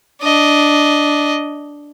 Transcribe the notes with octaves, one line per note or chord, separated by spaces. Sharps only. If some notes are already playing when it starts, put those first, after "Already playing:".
D4 D#5